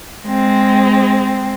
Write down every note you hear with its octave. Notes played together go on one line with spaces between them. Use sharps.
G#3 C4